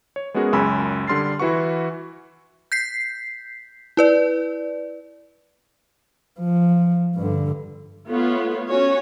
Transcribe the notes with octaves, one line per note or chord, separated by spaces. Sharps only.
C#5
G#3 B3 C#4 F#4 G#4 A#4
C#2 F#2 G#5 B5 E6
D3 G3 C6 F6 A6 C7
E3 E4 F#4 B4 F#5 C#6
G6 B6 C7
E4 B4 D5
F3
G2 D3
A3 B3 F4 C#5
C#4 F#4 C#5